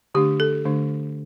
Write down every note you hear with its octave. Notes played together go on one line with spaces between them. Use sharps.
D3 A3 D4 G4
A4
D3 A3 D4